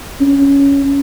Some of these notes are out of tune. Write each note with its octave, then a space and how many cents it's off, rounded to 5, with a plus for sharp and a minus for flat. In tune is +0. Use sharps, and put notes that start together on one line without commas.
C#4 +10